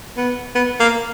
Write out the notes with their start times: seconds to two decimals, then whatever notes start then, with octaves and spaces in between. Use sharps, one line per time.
0.17 B3
0.55 B3
0.80 A#3